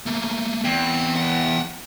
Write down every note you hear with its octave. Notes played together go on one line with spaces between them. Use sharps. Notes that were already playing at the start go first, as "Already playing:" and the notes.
A3 A#3
E2 C4 G5
F#5 G5